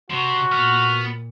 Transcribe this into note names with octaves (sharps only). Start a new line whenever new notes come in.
C3 F#4 C6
A#2 B3 F6